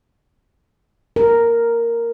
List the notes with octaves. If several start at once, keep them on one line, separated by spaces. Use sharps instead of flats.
A#4